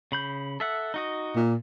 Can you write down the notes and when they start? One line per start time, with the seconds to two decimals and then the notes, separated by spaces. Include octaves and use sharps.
0.12 C#3 B5 G6
0.60 A4 E5 F#5
0.94 D#4 F#4 D#5
1.35 A#2